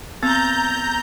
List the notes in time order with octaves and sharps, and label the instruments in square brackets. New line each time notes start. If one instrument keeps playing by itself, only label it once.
[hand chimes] B3 E6 A6 [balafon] C4 [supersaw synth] A#5 G6